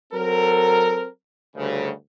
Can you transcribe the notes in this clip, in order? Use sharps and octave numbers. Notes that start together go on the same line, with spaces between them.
F#3 C4 A4 A#4
D2 G2 C#3